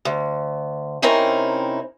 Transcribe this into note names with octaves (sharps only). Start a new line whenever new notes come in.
D2
C3 C4 C#4 D#4 E4 A#4